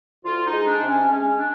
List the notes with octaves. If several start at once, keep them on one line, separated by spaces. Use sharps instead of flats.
D2 F4
D#4
G#3
D4
C3
C#4
G#3 C#4
C#4
D4